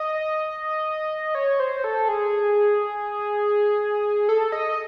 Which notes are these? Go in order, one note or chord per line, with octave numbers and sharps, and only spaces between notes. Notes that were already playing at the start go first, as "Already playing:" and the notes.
Already playing: D#5
C#5
C5
A4
G#4
A4
D#5